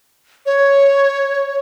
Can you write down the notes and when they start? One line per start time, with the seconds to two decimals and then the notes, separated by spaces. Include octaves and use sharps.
0.46 C#5